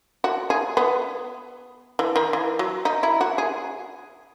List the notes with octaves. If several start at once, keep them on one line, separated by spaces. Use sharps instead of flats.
F#4
G#4
B3
E3
D#3
E3
F#3
D#4
E4
F#4
G#4